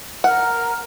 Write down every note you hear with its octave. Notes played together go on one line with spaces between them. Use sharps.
A#4 F#5 F6